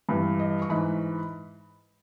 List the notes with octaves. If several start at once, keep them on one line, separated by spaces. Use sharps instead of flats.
G2 E3
D#5
C#6
G#2 E3 B5